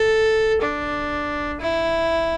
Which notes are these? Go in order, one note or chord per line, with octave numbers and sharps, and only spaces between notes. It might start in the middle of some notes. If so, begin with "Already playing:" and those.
Already playing: A4
D4
E4